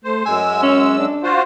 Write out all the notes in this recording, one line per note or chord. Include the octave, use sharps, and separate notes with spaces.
A3 C5
F#2 G#3 G#5 E6
C#4
D4
F4 F#4 C5